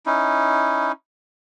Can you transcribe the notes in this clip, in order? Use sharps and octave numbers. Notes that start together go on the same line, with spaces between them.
C#4 D#4 E4